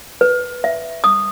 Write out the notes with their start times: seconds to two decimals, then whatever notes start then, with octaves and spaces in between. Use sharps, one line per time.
0.21 B4
0.64 E5
1.04 D#6